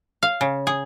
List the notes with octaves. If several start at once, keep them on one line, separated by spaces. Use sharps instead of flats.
F5
C#3
G#4